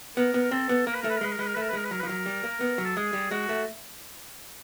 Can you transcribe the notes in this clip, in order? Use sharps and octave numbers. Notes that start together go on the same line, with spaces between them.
B3 A#4
B3
A#4
C4 A4
B3
A#3 A#4
B4
A#4
A3
B4
A#4
G#3 B4
A#4
G#3 B4
A#4
A3 B4
A#4
B4
G#3 A#4
B4
F#3 A#4
B4
F3
F#3 A#4
G3
A#3
B3
F#3
A4
G#3 G#4
G3
G#3 F#4
A3